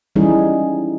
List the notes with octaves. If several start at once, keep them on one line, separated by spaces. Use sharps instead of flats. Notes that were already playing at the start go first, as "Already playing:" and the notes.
E3 G3 C#4 D#4 E4 G#4